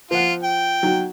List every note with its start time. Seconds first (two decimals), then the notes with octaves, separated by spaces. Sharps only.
0.11 F3 F4 F#5
0.43 G5
0.83 F#3 D#4 F#4